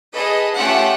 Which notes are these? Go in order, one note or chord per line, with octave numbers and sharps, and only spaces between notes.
G#4 A4 B4 D#5
A3 C#4 F4 G4 E5 F#5